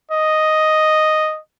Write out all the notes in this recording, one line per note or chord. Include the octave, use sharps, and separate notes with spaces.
D#5